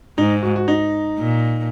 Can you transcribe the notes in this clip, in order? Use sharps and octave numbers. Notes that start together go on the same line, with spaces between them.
G#2 D#4
F#4
F#4
D#4
A#2